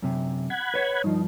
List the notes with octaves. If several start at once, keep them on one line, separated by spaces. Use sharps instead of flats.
F#2 C3
F#5 B5 G#6
B4 C#5
G2 F3 D#4